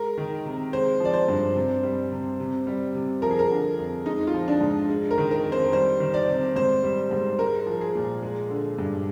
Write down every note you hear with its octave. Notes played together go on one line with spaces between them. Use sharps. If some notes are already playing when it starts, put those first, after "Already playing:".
Already playing: G#3 A#4
D#3
C3
G#3 C5
F3 D5
C5
G2
C3
G3
C3
C3
G3
C3
F3 A#4
G#4
A#4
D3
F2
G#3 D#4
F4
F3
D4
G#2
G#3
A#4
D#3
A#4
F2
C5
G3 C5
D#3
D5
C3
G#2 C5
G3
G#2
G#3 A#4
F3
G#4
A#2
G#3
D3
G2